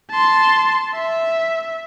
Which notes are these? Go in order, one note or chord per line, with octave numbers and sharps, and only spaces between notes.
A5 C6
E5